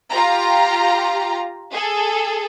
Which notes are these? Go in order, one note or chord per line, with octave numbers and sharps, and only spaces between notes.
F4 G4 A#5
G#4 A4